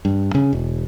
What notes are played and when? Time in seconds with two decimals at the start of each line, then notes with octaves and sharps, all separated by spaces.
0.05 G2
0.35 C#3
0.53 E1